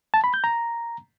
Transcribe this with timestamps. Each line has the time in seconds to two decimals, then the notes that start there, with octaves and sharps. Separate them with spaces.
0.14 A5
0.24 B5
0.34 G6
0.44 A#5